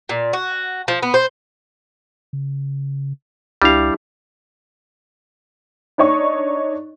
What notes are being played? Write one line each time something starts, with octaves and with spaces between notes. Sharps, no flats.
A#2
F#4
F3
B3
C5
C#3
C#2 G3 D4 E4 G4 F5
D4 D#4 C#5 D#5 C#6